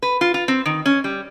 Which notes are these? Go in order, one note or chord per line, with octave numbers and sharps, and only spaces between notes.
B4
F4
F4
C4
D#3
C#4
G3